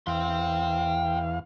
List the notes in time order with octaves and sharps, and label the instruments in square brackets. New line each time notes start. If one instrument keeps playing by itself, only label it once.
[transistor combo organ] E2 F5 [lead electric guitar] G5 C6